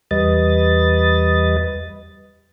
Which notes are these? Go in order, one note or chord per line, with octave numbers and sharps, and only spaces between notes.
E2 G3 B4 D#5 A6